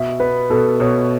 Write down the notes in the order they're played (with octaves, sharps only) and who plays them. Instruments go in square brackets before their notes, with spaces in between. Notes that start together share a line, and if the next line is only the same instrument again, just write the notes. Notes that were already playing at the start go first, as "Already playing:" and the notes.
Already playing: [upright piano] B2 [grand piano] E5
[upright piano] B3 [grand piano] B4
[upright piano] B2 [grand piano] A4
[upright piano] B2 [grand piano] C#5